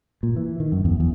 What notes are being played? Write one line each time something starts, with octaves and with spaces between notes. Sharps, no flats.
A#2
E3
D#3
F#2
E2
E2